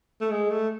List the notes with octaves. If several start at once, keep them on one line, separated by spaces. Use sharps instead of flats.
A3
G#3
A3